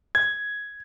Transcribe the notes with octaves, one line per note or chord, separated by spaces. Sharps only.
G#6